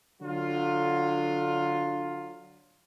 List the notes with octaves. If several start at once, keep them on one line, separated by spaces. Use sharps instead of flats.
D3 F#3 F4